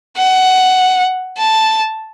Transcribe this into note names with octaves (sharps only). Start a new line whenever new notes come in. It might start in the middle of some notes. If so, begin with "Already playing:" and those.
F#5
A5